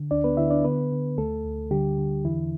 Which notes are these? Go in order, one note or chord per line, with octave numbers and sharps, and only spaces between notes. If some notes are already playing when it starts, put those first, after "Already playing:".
Already playing: D3
D2 D4 D5
B3 B4
D3 E4 E5
D4 D5
D3 B3 B4
D3
D2 A3 A4
D2
D3 G3 G4
D3
E2 E3 E4